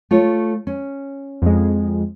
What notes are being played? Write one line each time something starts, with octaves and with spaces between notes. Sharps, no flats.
A3 F4 C#5
C#4
F2 G#3